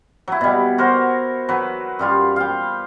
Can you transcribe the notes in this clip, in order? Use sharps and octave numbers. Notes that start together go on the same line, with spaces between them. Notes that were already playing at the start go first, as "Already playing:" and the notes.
F#3 E4
B2 G3
F#4 A#4 C5
F#3 B4
F#2 G3 F4
F5 G5